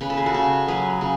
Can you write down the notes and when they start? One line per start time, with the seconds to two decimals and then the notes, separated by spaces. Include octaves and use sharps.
0.01 C#3 B4
0.10 A4
0.17 G#4
0.26 F#4 A4
0.34 C#3
0.68 F#3 G#4 B4
1.01 C#3